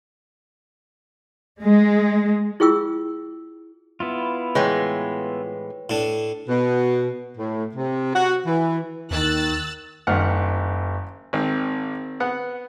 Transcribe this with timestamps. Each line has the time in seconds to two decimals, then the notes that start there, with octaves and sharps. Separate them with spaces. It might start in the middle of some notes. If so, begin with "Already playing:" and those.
1.62 G#3
2.60 E4 F4 G#4 G5 C#6 E6
4.00 B3 E4 F4
4.55 A2 E3 G#3 B4 C#5 G5
5.90 A2 D4
6.48 B2
7.37 A2
7.75 C3
8.14 F#4
8.46 E3
9.11 D#2 D#3 E6 F#6 A6
10.07 F#1 G2 D#3 F#5 F6
11.33 G#1 D#3 C4
12.20 B3 F#5